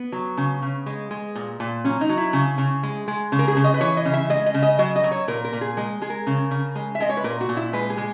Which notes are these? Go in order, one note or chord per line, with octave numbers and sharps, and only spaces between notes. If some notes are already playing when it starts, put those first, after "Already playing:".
Already playing: B3
F#3
C#3
C#3
G#3
G#3
A#2
A#2
F#3 C#4
D#4
F#3
E4
C#3
C#3
G#3
G#3
C#3
A#4
G#4
C#3
D#5
B4
E3 C#5
D#5
C#3
E5
G#3 D#5
D#5
C#3
D#5
F#3 D#5
D#5
F#3
C#5
A#2 A#4
A#4
A#2
G#4
G#3 A#4
G#3 G#4
A#4
C#3
C#3
G#3
E5
G#3 D#5
C#5
B4
A#2 A#4
F#4
A#2
E4
G#3 B4
G#4
G#3